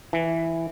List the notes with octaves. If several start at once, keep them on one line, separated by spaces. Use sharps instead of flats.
E3